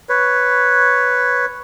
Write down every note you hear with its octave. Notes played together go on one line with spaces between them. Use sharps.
B4 C#5